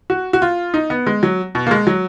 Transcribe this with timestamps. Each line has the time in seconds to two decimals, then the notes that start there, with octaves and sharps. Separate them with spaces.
0.10 F#4
0.33 F#4
0.42 F4
0.74 D#4
0.90 B3
1.07 G#3
1.23 F#3
1.55 B2
1.67 A#3
1.71 G#3
1.87 F#3